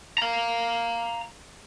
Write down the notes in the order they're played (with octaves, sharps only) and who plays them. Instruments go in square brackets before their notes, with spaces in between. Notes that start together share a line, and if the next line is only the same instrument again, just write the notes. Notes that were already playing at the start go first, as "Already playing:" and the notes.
[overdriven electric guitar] F5 A#5